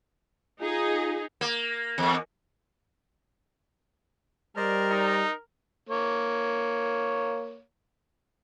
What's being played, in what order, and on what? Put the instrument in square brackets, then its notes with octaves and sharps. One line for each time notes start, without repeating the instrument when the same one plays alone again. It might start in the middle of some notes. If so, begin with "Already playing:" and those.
[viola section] D#4 G#4 [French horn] F4
[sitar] A#3
E2
[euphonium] G3 [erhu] A#4 [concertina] C5 D5 D#5
[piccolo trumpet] D#4
[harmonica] A#3 C#5